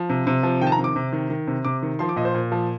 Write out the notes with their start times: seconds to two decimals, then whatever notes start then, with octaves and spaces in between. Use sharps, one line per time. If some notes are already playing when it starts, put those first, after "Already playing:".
Already playing: F3
0.09 C3
0.27 C3
0.43 F3
0.61 D#3 G5
0.67 A5
0.72 A#5
0.78 C3
0.84 D6
0.96 C3
1.12 D#3
1.30 D#3
1.47 C3
1.65 C3 D6
1.83 D#3
1.99 F3 C6
2.09 D6
2.16 A#2 D#5
2.25 C5
2.34 A#2
2.52 F3